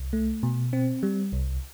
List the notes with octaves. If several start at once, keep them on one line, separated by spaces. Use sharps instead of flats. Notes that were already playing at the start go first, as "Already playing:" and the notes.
Already playing: C2
A3
B2
C4
G3
C2